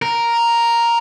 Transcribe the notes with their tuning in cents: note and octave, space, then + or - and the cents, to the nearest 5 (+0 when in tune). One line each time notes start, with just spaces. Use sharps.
A#4 +0